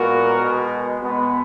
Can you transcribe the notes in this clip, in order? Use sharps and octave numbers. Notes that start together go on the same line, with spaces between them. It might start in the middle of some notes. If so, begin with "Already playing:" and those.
Already playing: A#2 G#3 B3 F#4 A#4
B2 G#3 B3
B2 G#3 B3